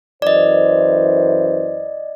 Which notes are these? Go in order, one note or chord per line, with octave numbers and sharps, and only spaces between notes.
F#2 E3 C5 D5 D#5